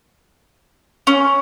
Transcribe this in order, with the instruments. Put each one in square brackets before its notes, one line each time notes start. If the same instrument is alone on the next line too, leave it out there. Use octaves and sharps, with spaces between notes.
[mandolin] C#4